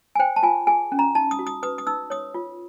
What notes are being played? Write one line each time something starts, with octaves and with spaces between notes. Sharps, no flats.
G#5
C5 G5
A5
F4 G#5
G#4 G#5
C#4
A#5
D#4 A5
D#6
F#4
D#6
B4 D#6
D#6
D#4 E6
C#5 D#6
F4